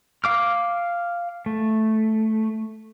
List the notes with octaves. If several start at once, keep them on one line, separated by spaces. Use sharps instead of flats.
F5 D6 F6
A3